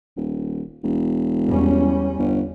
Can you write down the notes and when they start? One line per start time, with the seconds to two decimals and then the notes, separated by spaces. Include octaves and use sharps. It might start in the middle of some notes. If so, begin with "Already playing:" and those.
0.17 D#1
0.83 E1
1.46 E2 G3 C#4
2.18 G1